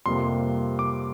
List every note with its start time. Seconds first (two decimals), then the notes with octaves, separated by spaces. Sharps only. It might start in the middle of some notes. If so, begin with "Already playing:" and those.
0.06 F2 C3 G3 A#3 C6
0.79 D6